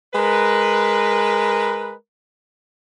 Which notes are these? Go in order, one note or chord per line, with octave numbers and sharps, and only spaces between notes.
G#3 A#4 B4